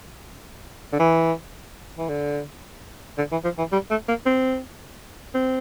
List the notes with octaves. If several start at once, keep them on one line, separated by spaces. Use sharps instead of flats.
D3
E3
E3
D3
D3
E3
F3
E3
G3
A3
A#3
C4
C4